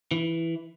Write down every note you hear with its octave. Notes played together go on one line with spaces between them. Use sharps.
E3